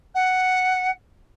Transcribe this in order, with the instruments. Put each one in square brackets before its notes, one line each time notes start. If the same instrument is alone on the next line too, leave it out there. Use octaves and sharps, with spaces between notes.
[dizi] F#5